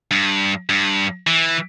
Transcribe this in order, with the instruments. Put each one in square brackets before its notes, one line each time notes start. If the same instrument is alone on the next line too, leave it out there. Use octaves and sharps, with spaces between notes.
[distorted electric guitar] G2
G2
E3